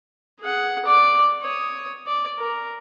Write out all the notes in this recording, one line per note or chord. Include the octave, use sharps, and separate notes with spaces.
G#4 F#5
D5 D6
C#5 D#6
D5
A#4